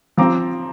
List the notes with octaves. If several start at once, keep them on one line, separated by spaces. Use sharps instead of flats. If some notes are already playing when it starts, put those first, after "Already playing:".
F3 C4 A#5 D6